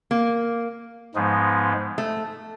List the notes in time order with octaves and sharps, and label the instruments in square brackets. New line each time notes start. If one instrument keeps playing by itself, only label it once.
[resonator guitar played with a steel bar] A#3
[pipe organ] G#2 F3 G#3 B3 D#4
[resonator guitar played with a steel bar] A3